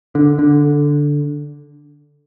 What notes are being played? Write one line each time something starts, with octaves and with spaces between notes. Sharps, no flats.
D3
D3